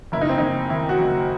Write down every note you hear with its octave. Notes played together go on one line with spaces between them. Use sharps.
F#1 E4
D#4
C4
F#1 D#4
D#3 E4
F#4
F#1